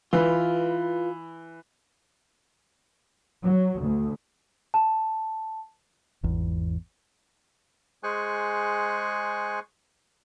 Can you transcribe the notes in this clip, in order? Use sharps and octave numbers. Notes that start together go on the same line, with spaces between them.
E3 F4 B4
F#3
D2
A5
G#1 E2
G#3 G#4 C5 G#5 C#6 F#6